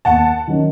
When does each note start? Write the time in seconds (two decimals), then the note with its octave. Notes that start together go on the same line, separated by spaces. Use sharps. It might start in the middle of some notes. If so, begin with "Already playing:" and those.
0.05 D#2 F#5 A5
0.47 D#3 F#3 C#4